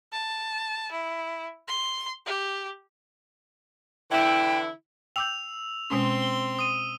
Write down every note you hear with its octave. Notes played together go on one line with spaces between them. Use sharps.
A5
E4
C6
G4
D3 E3 E4 G5
G5 D6 E6 G6 F7
B2 G#3 C4 C#4 C6
G7
D#6 D#7